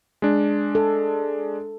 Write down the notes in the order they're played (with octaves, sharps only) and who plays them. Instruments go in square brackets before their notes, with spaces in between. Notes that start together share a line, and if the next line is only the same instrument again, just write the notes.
[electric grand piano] G#3 D4
[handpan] A4